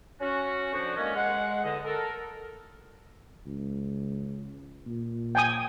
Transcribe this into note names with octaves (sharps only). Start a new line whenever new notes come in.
C#4 F#4
D3 F3 F#4
D3 D#3 G#3 A#3 C#4
G#3 F#5
E2 D3 D#5
A4 A#4
C#2
A#2
G5 G#5 D#6